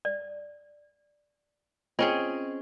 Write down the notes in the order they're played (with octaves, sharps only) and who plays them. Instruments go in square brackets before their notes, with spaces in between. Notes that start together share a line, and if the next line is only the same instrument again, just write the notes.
[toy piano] D5
[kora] C4 C#4 G#4 [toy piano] F4 D#5